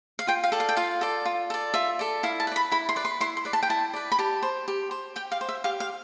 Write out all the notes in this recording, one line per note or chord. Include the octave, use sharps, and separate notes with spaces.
F5
F4 G5
F5
A4 D5
F5
G5
F4 F5
A4 D5
F4
A4 D5
F4 E5
A4 D5
E4 F5
A5
B4 D5
B5
E4 B5
C6
B4 D5
C6
E4 C6
C6
B4 D5
A5
G5
E4 A5
B4 D5
B5
G4 A5
C5
G4
C5
G4 G5
F5
C5
E5
G4 F5
F5